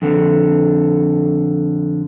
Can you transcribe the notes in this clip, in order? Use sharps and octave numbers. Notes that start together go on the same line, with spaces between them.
F2 D3